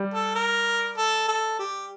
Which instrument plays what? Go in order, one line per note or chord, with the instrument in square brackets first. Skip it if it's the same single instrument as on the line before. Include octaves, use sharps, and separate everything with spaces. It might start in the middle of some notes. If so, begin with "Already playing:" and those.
Already playing: [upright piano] G3
[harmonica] A4
A#4
A4
A4
G4